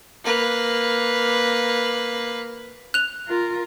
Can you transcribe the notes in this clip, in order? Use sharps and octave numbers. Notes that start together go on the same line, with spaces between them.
A#3 B4
F#6 F7
F4 A#4